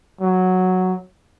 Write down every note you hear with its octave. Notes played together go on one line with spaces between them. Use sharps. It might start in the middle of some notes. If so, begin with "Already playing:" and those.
F#3